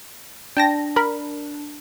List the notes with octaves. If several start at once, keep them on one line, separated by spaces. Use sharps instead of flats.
D4 G5 A5 A#6
A#4 B5